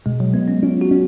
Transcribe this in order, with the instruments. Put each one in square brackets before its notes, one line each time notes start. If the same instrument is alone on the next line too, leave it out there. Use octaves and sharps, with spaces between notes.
[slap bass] B2 [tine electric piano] G#3
[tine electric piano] F#3
[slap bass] G#3 [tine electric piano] B3
[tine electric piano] C#4
[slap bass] C#4 [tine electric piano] F4
[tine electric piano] F#4
[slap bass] C#4